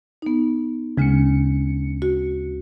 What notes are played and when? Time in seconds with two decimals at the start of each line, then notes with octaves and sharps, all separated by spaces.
0.22 B3 D#4
0.97 D2 C#3 G#3 C#4 C#7
2.02 F#4